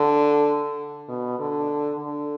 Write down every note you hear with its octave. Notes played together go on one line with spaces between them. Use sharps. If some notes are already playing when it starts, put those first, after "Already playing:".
Already playing: D3
B2
D3
D3